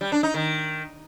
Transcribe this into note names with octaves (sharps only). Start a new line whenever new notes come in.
G3
D4
D#4
D#3